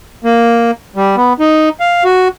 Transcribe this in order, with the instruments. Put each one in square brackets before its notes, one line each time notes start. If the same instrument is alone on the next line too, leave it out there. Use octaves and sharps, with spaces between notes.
[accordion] A#3
G3
B3
D#4
F5
F#4